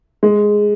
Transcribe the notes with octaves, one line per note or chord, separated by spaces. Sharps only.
G#3